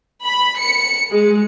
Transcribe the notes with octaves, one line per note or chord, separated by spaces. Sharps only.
B5
C#7
G#3